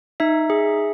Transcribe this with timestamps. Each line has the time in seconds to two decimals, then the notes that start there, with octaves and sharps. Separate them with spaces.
0.20 D#4 E5
0.50 G#4